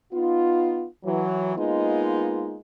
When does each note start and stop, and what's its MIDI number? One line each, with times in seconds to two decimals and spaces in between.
0.12 0.84 59
0.12 0.84 63
0.12 0.84 65
1.04 1.55 52
1.04 1.55 54
1.56 2.57 56
1.56 2.57 58
1.56 2.57 59
1.56 2.57 63
1.56 2.57 65